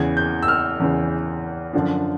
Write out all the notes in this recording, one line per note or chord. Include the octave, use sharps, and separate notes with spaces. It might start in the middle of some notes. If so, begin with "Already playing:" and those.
Already playing: E2 C#3 E3 G#6
G6
E6
F6
E2 C#3 E3
F#2 D3 F3